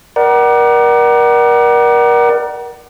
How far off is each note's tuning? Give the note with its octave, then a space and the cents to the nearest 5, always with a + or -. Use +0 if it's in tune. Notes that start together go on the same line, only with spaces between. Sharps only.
A#4 +30 D5 +20 F#5 +35